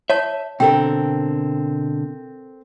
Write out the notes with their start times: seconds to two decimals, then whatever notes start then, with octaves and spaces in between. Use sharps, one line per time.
0.10 C#5 E5 A5
0.60 B2 D3 C4 A4 A#4 G5